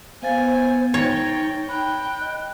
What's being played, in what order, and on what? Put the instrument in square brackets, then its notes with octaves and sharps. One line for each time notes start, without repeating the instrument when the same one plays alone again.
[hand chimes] B3 F5 A6 [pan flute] C5 [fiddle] G#5
[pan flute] D#4 [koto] C#5 [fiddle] G5 [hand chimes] A6 A#6
[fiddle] G5 [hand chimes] B5 [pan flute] F#6
[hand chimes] D#5